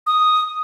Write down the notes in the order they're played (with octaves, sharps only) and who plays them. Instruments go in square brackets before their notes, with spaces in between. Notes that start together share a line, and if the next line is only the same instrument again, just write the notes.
[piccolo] D#6